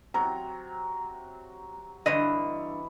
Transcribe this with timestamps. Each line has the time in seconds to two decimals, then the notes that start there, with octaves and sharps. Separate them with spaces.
0.14 C3 F#3 A#5
2.06 G2 D3 E3 D#5